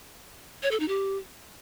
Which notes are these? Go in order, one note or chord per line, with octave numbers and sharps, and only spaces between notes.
C#5
A4
D#4
G4